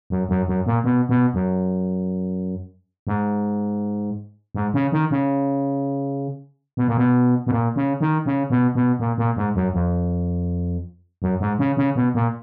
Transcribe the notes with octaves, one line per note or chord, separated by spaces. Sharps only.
F#2
F#2
F#2
A#2
B2
B2
F#2
G#2
G#2
C#3
D#3
C#3
B2
A#2
B2
B2
A#2
C#3
D#3
C#3
B2
B2
A#2
A#2
G#2
F#2
F2
F#2
G#2
C#3
C#3
B2
A#2